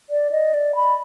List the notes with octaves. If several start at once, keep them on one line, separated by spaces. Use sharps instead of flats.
D5
D#5
D5
B5